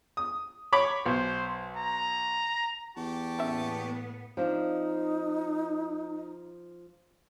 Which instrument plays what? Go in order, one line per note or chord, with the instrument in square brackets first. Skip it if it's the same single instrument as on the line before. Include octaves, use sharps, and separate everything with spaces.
[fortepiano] D#6
C#5 B5 D6
[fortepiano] B1 [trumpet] C5
[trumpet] A#5
[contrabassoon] E2 [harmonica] G4 A5 C#6
[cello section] A2 A#3 B3 [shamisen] F#3 C#4 E5
[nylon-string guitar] F3 C4 D4 [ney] D#4